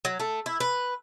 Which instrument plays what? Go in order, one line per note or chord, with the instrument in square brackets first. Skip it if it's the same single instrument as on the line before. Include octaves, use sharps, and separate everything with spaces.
[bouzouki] F#3
A3
E4
B4